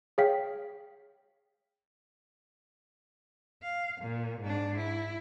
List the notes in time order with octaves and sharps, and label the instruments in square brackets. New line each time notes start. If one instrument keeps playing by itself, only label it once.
[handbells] G#4 C#5 F5 G5 B6
[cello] F5
A#2
G#2 D4
E4